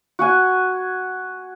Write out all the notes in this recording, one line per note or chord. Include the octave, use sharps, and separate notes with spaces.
F#4 F#5 G#5